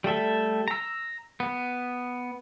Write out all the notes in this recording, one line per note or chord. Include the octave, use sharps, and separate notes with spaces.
G3 A3 A4 E5
A#5 E6
B3